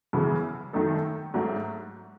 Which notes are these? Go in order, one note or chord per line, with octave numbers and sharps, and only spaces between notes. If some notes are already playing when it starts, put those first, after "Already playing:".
F#2 C#3 E3 B3
F#2 D#3 A3 D#4 A4
G#2 F#3 A3